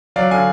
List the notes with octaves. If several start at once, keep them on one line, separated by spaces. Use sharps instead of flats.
F#3 D5 F5
D3 F5 G#5